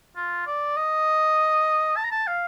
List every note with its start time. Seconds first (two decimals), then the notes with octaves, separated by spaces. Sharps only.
0.16 F4
0.47 D5
0.76 D#5
1.97 A5
2.04 A#5
2.11 A5
2.27 F5